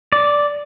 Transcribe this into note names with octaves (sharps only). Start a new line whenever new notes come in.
D5